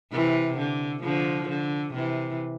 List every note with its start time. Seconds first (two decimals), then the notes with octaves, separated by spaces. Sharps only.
0.13 C3 E3
0.58 D3
1.03 D3 F3
1.49 D3
1.94 C3 E3